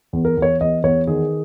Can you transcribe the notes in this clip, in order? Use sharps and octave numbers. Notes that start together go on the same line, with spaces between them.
E2
A#4
E2
C#5
E2 D#5
E2 C#5
D#3 G#4